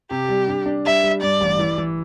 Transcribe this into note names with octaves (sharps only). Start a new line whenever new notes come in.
C3 G4
G3
D4
D4
G3 E5
G3
G2 D5
A1
E3
E3